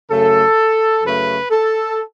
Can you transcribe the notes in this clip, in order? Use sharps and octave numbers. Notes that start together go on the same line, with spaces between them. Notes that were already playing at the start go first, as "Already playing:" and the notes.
F#2 C#3 A3 A4
F#2 C#3 A3 B4
A4